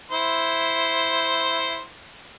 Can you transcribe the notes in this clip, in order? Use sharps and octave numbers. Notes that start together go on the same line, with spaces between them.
E4 C5